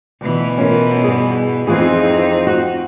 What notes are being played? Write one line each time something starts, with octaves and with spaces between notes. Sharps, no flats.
D2 B2 E3
C#4 F4 A#4
G2 G#4
F2 E3 C4 D#4 F4 G#4
F#4